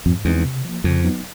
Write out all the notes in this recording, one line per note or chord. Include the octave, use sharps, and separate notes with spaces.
F2 G#2
E2 F3 G#3 C4 D#4
C3
F3 A#3
F2 C#3
F#3 B3 D#4